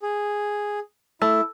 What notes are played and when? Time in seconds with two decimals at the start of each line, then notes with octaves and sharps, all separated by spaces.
0.02 G#4
1.22 A3 E4 E6